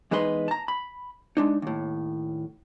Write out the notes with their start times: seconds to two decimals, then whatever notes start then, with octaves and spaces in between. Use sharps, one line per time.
0.11 E2 G#3 D#4 B4 C6
0.48 A5 A#5
0.68 B5
1.37 G#3 D4 D#4
1.62 D#2 A2